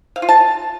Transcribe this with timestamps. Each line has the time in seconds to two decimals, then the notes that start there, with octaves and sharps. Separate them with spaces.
0.16 F5
0.22 F4
0.29 A5